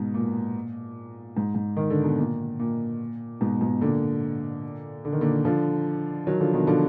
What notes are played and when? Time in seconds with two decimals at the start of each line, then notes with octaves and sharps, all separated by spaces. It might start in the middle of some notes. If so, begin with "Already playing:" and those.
Already playing: G#2 B2
0.14 A#2
1.37 G#2
1.55 G#2
1.77 D#3
1.90 D3
2.04 B2
2.18 A#2
2.60 A#2
3.41 G#2 B2
3.61 G#2 B2
3.81 A#2 D3
5.05 D3
5.13 D#3
5.21 A#2 D3
5.45 D3 F3
6.27 D#3 F#3
6.40 D3 F3
6.53 B2 D#3
6.67 D3 F3